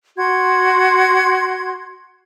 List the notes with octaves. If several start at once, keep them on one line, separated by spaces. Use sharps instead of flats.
F#4 C6 G#6